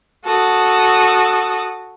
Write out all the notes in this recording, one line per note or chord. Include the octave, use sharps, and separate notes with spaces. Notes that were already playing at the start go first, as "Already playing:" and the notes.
F#4 A4 D#6